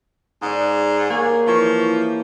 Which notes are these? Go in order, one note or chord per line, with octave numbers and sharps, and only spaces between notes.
G#2 G#4 D5
A#3 G4 G#4 C#5
E3 F3 C#5